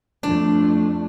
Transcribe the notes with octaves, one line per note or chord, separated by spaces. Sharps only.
F2 A3 D4